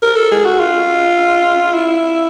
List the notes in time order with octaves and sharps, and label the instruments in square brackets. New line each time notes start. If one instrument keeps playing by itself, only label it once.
[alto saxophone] A#4
A4
G#4
F#4
F4
E4